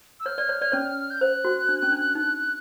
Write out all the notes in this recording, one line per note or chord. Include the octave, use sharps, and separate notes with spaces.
E6
C#5 F6
D5
C#5
D5
C#4 C#5
G6
C5 F#6
F#4
D4
C#4
D4
D#4